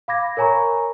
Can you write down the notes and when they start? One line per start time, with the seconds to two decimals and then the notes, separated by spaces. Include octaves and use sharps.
0.08 F5 B5 D6 G#6 A#6
0.37 A#4 C#5 G#5 A#5 B5 C#6